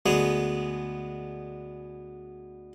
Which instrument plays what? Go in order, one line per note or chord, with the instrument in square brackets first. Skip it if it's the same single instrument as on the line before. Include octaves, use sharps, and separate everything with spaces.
[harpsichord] D2 G#3 B3 G#4